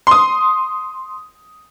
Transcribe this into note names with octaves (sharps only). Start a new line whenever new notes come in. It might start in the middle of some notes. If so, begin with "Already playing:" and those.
C6 D#6